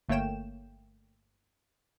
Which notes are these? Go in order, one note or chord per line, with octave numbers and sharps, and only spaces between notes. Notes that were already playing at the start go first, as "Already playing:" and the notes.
G1 A3 A#3 C#5 G5 E7